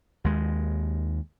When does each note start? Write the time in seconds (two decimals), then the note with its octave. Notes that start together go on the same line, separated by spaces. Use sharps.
0.24 D#2 G#3